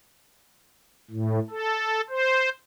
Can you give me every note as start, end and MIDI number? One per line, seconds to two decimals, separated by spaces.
1.11 1.39 45
1.50 2.01 69
2.09 2.49 72